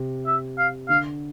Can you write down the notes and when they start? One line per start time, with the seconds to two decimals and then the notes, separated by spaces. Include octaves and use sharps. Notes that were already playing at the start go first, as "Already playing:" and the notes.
Already playing: C3
0.27 E5
0.58 F5
0.89 D3 F5